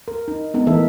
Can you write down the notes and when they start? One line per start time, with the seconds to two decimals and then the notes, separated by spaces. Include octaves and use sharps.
0.08 A#4
0.28 D#4
0.54 G#3 B3 D#4
0.67 E3 A3 D#4 A4 A#4 E5